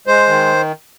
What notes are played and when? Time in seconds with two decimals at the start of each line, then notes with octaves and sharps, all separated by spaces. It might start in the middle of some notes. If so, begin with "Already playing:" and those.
0.07 G#3 C5
0.27 D#3